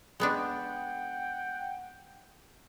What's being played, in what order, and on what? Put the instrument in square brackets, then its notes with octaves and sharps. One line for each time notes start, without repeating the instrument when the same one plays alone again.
[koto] G#3 B3 D4 [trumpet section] F#5 G5